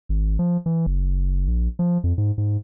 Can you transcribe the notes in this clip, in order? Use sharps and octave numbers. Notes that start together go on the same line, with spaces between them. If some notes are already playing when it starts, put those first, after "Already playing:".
G#1
F3
E3
F#1
A#1
F3
F2
G#2
G#2